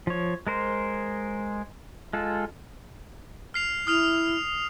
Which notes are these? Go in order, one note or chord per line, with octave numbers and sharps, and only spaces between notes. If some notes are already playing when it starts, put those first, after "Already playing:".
F3 C#5
G#3 A#4 C5
G#3 F4 A4
F6 C7 F7
E4 D#6 F6 F7